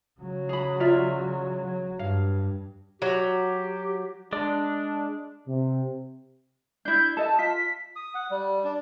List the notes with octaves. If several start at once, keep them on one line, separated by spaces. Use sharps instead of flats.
C#3 F#3
G#4 B5
F4 D5 E5
F#3
G2 F5
F#3 G4
G#3 D4 D5
C3
D4 E4 G6
A4 D#5 E5 A5
F4 B6
D#6
F#5
G3
D4